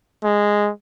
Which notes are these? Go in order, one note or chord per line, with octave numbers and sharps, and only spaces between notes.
G#3